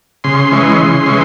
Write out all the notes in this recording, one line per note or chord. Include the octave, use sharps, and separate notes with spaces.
C#3 C6
E3 G#3 C#4
C#3
E3 G#3 C#4